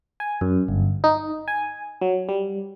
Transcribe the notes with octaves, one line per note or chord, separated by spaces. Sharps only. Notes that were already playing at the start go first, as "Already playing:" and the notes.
G#5
F#2
G1
D#4
G#5
F#3
G3